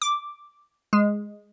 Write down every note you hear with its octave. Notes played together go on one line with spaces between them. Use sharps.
D6
G#3